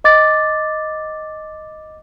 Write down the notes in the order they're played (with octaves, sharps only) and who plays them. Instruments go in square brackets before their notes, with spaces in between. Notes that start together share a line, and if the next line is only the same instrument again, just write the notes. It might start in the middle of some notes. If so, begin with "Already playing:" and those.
[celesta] D#5 D6 A6